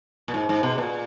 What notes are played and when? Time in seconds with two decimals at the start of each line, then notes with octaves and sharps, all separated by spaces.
0.28 A#2
0.34 G#2
0.49 G#2
0.63 B2
0.78 A#2